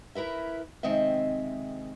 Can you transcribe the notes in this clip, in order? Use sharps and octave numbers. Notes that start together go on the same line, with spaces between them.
E4 A#4 B4 E5
C3 D#3 G#3 C4 D#5 E5